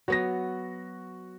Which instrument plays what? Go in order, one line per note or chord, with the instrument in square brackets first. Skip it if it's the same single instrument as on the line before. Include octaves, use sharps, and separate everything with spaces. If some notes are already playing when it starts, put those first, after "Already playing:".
[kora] F#3 B3 [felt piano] F#4 A#6